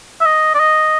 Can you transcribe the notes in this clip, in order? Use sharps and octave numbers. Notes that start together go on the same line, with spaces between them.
E5
D#5
D5
D#5